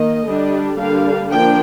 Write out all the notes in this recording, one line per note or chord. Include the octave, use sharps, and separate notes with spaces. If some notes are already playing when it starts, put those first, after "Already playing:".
Already playing: D#3 A#3 D#5
D3 G3 D4
D3 G3 A#3 D4 F5
F3 A#3 D4 G5